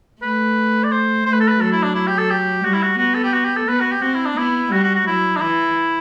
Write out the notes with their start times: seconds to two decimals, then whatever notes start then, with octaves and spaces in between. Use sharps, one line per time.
0.22 A3 B4
0.84 D5
0.92 C5
1.25 A3 C5
1.32 B4
1.40 A4
1.48 B4
1.61 F#3 A4
1.72 E4
1.83 D4
1.95 E4
2.07 G4
2.18 A4
2.30 G4
2.64 G3 F#4
2.73 E4
2.82 F#4
2.98 B3 F#4
3.14 A4
3.23 G4
3.33 F#4
3.45 G4
3.56 A4
3.68 B3 B4
3.80 F#4
3.92 G4
4.02 C4 F#4
4.14 E4
4.26 D4
4.37 B3 E4
4.72 G3 F#4
4.83 F#4
4.96 F#4
5.07 F#3 E4
5.36 D4
5.41 E3 E4